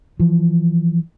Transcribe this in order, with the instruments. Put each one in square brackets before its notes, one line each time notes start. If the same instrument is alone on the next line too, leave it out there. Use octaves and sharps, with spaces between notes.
[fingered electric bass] E3 F3